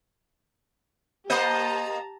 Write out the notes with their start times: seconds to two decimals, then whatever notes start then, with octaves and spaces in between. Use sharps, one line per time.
1.30 A#3 G4 C5 D#5 A5 A#5